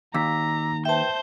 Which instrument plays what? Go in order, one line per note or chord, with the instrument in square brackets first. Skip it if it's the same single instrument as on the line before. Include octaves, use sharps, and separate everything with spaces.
[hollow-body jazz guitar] D#2 [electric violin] A#5 [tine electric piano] D6 E6 B6
[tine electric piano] B4 G5 [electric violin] C5 G6 [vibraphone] E5 A5